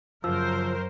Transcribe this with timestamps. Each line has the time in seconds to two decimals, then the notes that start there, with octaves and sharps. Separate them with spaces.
0.24 F#2 C#3 F3 A#4 C5 E6